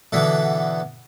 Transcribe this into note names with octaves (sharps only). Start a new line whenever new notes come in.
B2 D3 E3 B3